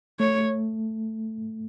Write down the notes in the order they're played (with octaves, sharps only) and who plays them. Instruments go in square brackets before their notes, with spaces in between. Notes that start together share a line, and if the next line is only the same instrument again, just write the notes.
[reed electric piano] A3 [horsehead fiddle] C#5